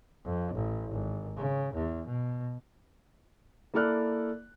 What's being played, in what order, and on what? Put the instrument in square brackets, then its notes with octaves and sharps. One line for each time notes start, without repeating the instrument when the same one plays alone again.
[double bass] F2
A1
G#1
C#3
E2
B2
[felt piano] A#3 E4 A4 D5 F6 F#6